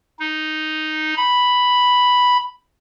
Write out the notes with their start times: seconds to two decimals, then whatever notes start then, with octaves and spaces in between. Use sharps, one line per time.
0.19 D#4
1.17 B5